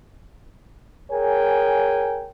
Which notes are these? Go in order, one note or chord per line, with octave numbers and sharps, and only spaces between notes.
G#4 A#4 C#5 G5 G#5